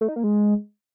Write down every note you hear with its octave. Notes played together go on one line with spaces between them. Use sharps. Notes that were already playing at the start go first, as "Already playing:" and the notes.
A3
D#4
A#3
G#3